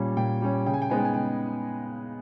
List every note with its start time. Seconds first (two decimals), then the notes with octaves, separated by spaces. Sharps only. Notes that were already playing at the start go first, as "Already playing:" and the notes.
Already playing: A#2 G3 C#4
0.17 A#2 G5
0.42 G3 C#4
0.66 C#3 G5
0.74 G#5
0.82 G5
0.90 G#3 B3 D#4 G#5
0.98 G5
1.05 G#5
1.14 C#3 G5